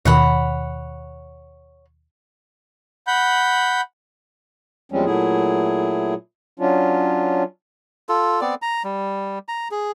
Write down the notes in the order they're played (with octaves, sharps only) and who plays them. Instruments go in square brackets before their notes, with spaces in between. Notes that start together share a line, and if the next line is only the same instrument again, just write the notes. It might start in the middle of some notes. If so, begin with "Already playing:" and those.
[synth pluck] D#2 B2 D#3 [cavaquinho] C#5 F#5 B5
[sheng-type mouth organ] F#5 B5 G6
[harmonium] E2 F3 G3 G#3 C4 C#4
A#2 F#3 A3 E4 G#4
F#3 C#4 D4 F4
[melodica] F4 A4
B3 C4 D5
A#5
G3
A#5
G#4